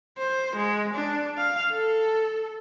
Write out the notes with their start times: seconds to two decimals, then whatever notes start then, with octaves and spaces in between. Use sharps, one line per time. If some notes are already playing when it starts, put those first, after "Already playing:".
0.18 C5
0.56 G#3
0.95 D4
1.38 F5
1.73 A4